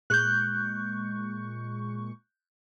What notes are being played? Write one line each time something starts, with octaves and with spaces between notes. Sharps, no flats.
A#2 G#3 C#6 F#6 G6